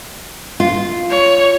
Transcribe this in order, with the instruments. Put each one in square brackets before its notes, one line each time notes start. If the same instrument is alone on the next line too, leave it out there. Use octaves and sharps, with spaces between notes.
[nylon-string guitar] F4
[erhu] C#5